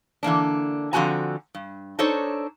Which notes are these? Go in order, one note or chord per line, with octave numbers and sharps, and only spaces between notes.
D3 E3 A#3 D4
D3 F3 C4 F#4 G#5 A#5
G2
D4 D#4 A4 C5 C#5